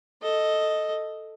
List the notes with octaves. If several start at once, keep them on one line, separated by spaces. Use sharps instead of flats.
A4 D#5